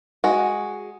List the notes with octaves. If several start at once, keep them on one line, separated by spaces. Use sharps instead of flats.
G#3 F#4